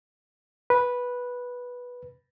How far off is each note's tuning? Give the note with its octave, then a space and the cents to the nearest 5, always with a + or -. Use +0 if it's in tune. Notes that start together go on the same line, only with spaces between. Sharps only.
B4 -10